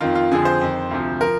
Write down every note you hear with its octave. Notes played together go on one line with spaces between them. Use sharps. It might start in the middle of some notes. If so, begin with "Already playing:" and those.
F2 D#3 F4
F4
F2 D3 F3 G#4
C5
F2 D#3
D2 C3 F3
F3 A#4